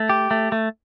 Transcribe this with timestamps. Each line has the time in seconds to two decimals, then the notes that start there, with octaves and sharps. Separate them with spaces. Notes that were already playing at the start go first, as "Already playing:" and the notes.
Already playing: A3
0.10 G4
0.31 A3
0.52 A3